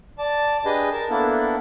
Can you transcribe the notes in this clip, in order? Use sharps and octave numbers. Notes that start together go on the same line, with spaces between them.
D5 A5
D4 G4 G#4 B4 D#5
A#4 A5
A#3 B3 D4 E4 A4